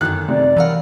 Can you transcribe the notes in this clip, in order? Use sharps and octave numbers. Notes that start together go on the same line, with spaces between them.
F#2 D3 D#3 F#6
C3 D5
E3 F#3 A#4 F5 F#5